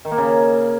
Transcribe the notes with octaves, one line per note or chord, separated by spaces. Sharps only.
D#3
A#3
C#3